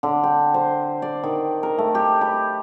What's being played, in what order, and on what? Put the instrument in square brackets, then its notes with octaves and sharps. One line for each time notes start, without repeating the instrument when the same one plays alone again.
[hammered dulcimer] D3
G5
C5
D5
D#3
A#4
A3
G4
B5